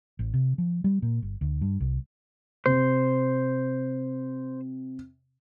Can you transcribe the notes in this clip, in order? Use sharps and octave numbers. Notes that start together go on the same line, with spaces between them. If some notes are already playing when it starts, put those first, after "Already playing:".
A1
C3
F3
G3
A#2
G1
D2
G2
C2
C3 C5